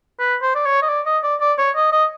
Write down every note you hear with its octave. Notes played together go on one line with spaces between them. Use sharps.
B4
C5
D5
C#5
D#5
D5
D#5
D5
D5
C#5
D#5
D#5